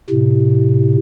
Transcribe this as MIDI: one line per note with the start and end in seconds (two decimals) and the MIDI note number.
0.10 0.97 45
0.10 0.97 48